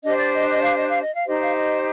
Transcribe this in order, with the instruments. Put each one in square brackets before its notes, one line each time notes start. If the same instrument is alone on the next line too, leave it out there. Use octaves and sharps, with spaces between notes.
[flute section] D4 G4 C5 D#5
D5
D#5
D#5
F5
D#5
F5
D#5
F5
D#4 G4 C5 D#5
F5
D#5